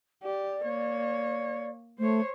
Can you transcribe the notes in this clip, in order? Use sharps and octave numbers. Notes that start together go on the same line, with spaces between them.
G4 D5
A#3 C#5
A3 C5 C#5